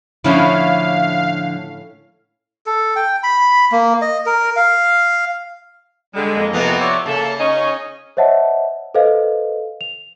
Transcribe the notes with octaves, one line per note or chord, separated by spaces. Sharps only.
A2 D3 F3 C#4 D4 E4 F5
A4
G5
B5
A#3
D#5
A#4
F5
D3 G3 G#3
F2 A#3 D#5
C3 E3 F3 B3
C#5 D5 E5
C#3 A#3 A4 E5 A5
C#4 D#4 C#5 D#5 G#5
C5 C#5 D#5 E5 F#5 A5
A4 B4 C5 D#5 F5
F7